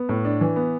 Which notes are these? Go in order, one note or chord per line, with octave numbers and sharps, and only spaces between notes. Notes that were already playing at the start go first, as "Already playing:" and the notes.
Already playing: B3
A2
D4
E3
B3